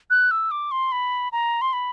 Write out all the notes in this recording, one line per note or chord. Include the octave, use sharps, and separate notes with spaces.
F#6
E6
D6
C6
B5
A#5
C6
B5